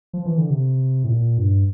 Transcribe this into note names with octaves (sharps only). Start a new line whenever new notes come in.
F3
E3
D3
C3
A2
A#2
G2